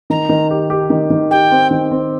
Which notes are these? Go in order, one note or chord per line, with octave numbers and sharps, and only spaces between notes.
D#3 A#5
D#3
G4
G4
D#3
D#3
G4 G5
C4
D#3
C4